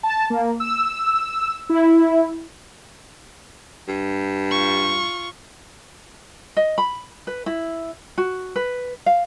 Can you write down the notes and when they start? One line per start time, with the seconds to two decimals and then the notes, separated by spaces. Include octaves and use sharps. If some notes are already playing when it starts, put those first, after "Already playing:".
0.03 A5
0.30 A#3
0.60 E6
1.69 E4
3.88 G2
4.51 F4 C#6
6.57 D#5
6.78 B5
7.27 B4
7.46 E4
8.18 F#4
8.56 B4
9.06 F5